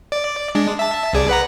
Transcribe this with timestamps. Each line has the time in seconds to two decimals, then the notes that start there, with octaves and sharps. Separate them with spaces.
0.12 D5
0.55 G#3 D4
0.79 E5 A5
1.13 C2 G#4 D5
1.29 B4 F#5 A#5